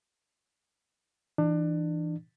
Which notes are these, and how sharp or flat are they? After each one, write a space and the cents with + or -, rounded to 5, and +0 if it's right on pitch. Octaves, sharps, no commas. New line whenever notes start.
E3 +0 D4 +30